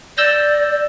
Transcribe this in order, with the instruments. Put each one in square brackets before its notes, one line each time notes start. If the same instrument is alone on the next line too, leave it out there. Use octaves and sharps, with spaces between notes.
[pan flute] D5 [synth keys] E6 G6 A#6